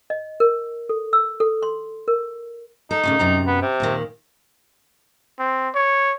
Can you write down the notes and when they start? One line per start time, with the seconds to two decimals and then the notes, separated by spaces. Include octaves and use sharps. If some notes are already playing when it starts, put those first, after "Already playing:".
0.10 D#5
0.40 A#4
0.89 A4
1.13 E6
1.40 A4
1.62 C6
2.08 A#4
2.91 D#4 A4
3.03 A#2 C#3 A3
3.19 F#2 C3 A#5
3.47 B3
3.62 C3
3.80 D#2 A#2 D#3
5.39 C4
5.75 C#5